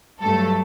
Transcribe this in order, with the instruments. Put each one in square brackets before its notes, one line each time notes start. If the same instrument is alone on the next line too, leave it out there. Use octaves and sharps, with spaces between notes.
[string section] G2 F#3 A3 A4